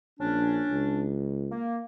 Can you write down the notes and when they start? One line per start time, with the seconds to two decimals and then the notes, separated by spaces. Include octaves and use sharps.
0.20 A#1 C#4 D4
0.70 C#2
1.50 A#3